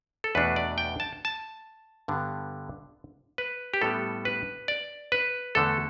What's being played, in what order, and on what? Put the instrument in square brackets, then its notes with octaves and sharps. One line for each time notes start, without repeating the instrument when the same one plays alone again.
[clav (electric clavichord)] A4
E2 B2 A3 D4 B4
D5
G5
A5
A5
G2 D3 G3 B3 D4
B4
G4
A2 G3 B3 D4 A4
B4
D5
B4
E2 D3 A3 A4